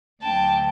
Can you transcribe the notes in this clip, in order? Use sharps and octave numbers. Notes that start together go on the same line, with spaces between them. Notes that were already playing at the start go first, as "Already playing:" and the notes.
D2 D3 F#3 G5 A5